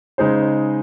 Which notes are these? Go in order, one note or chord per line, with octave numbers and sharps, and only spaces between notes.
C#3 G#3 D#4 G#4 C5